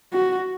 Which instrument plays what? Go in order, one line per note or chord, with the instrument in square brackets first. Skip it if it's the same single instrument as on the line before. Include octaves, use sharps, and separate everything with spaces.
[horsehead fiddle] F#4